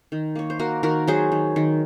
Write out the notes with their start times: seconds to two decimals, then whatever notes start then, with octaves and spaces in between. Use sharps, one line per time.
0.12 D#3
0.36 A#3 C#5
0.50 C5
0.59 A#3 F#4 A#4
0.83 D#3 F#4 A#4
1.07 F#3 G#4 C5
1.32 D#3
1.56 D#3